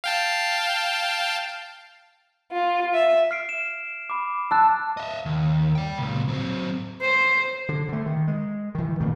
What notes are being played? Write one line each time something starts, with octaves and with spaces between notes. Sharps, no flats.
F5 G5 A5
F4
E5
F6 C7 D7
E7
B5 D6
A5 E6 F#6
D#5 E5
D#2
D5 G5
C#2 A#2
F#3 C4
C5
D3
D3 A3
D#3
G#3
D#3 E3
A#2 D#3 A3 A#3